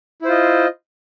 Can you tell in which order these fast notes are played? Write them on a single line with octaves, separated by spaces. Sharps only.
E4 C5 F4 D#5